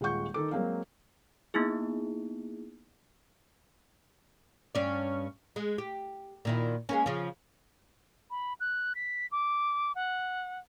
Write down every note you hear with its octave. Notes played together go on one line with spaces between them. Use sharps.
D#1 G#3 F4 F#5 C#6 G6
D#3 A4 D6
F#3 G#3 A#3 C4 F5
A#3 B3 D#4 E4 G#4
G2 C#4 D5
G#3
G4
A#2 D#3 E4
G#3 A#3 C#4
C#3 F3
B5
F#6
B6
D6
F#5